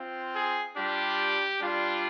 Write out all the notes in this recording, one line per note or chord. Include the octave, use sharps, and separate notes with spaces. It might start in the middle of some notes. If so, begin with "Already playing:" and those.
Already playing: C4 F4
G#4
G3 D4 F4 G4
G3 D4 F4